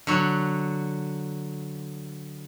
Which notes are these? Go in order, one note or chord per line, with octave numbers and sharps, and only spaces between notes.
D3 F#3